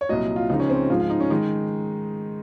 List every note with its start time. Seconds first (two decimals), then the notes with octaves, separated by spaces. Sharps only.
0.01 C#5
0.09 C2 A#2 F#3 D#5
0.36 F4
0.49 C#2 C#3 F3 G#3 D#4
0.60 C#4
0.70 C4
0.90 G#2 F3 G#3 F4
1.00 F4
1.10 D#4
1.20 C#4
1.30 D#3 G#3 D#4